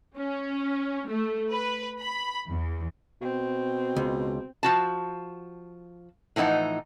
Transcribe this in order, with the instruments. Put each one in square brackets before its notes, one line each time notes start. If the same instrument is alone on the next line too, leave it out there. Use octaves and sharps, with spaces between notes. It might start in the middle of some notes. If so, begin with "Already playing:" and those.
[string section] C#4
A3
B4
B5
E2
[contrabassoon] B2 [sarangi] C4
[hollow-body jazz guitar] C#2
[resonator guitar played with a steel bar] F3 F#4 A5
A2 E3 F3 D#4 F#5